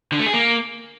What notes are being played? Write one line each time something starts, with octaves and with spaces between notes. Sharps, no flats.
D3
A3
G#4
A#3